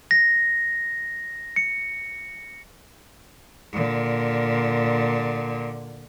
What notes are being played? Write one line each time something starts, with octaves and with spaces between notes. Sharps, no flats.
A#6
C#7
A#2 D3